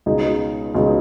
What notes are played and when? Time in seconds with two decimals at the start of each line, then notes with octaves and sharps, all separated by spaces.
0.06 C#2 B2 G#3 D#4 G#4
0.75 C#2 B2 G#3 D#4 G#4